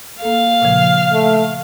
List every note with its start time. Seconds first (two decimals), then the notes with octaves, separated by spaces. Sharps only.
0.22 A#3 A4 F5
0.61 A#2 C#3 F3
1.12 A3